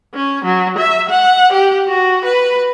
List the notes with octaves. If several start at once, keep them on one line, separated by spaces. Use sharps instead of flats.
C#4
F#3
E5
F#5
G4
F#4
B4